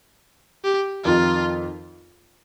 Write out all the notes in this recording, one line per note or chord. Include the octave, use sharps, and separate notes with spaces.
G4
F2 D#3 C4 D#4 F4